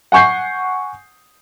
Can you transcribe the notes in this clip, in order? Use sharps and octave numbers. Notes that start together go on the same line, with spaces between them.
F#5 G#5 C#6 G6 C7